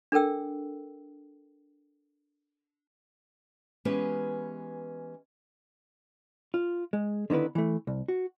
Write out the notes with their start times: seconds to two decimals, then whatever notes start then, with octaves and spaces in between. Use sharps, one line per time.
0.12 D4 A4 A#4 G5 E6
3.85 E3 G#3 B3 C#4 G4 B4
6.54 F4
6.93 G#3
7.30 D3 D#3 B3 E4 B4
7.55 E3 A3
7.87 C2
8.08 F#4